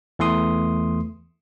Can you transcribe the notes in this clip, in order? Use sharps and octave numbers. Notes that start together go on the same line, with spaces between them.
E2 E3 A3 C6 D#6